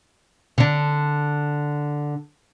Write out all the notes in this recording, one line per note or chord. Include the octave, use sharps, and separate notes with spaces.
D3 D4